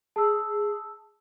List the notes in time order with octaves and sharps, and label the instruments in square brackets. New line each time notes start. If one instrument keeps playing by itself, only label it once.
[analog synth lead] G#4 [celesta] A5 E6